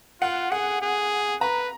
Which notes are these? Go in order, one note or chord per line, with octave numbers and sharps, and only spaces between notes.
F4 F#5
G#4 F#5
G#4
B4 A#5